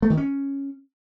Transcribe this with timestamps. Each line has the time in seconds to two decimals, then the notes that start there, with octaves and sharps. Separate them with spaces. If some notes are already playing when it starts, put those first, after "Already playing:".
0.02 A3
0.10 D#3
0.17 C#4